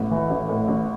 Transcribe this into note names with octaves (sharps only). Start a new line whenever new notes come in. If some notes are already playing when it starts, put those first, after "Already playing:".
Already playing: A1 A2
E3
A1
A2
A1